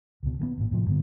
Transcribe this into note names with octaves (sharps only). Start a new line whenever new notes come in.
C#2 B2
D#3 G#3 B3
G#1 A#2
A2 C3 F3
G2 D3 B3